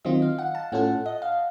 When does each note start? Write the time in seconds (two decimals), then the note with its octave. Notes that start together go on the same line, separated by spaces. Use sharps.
0.05 D#3 F#3 C4 F4 D#5
0.22 F5
0.38 F#5
0.55 A5
0.72 A2 A3 C#4 F4 A4 F#5
1.06 D#5
1.22 F5